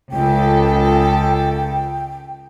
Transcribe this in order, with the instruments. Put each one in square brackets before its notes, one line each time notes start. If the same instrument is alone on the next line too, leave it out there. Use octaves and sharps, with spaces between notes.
[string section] C#2 A4 [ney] G5